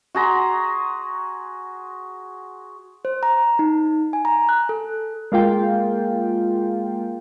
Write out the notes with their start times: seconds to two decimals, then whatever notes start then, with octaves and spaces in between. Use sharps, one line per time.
0.15 F#4 G#4 A#5 C6
3.05 C5
3.23 A#5
3.59 D#4
4.13 G#5
4.25 A#5
4.49 F#6
4.69 A4
5.32 G#3 A#3 F4 G5